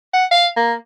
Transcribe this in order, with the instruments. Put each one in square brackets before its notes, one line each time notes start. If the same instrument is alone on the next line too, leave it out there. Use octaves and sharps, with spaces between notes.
[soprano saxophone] F#5
F5
A#3